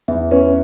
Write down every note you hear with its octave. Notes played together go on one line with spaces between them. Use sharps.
E2 E5
C#4 B4